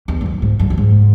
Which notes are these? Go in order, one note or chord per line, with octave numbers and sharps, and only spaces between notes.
E2
G#2
F#2
G#2
F#2
F#2
G#2